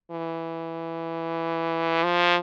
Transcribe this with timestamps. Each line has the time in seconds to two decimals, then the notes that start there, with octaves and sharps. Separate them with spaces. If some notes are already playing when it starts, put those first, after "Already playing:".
0.11 E3
2.04 F3